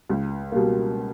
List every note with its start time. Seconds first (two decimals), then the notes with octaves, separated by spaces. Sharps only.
0.09 C#2
0.52 B2 G3 A#3